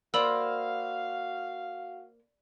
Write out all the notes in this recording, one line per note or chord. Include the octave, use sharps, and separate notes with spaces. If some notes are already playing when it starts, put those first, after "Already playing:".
A#3 F#4 C5 D5 F5 B5 E6